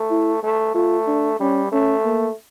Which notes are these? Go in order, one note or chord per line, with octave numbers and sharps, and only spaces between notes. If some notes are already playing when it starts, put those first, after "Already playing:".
Already playing: A3
E4
A3
A3 F4
D4
G3 C#4
A3 C#4
A#3